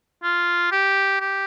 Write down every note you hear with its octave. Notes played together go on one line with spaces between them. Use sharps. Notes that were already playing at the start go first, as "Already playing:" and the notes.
F4
G4
G4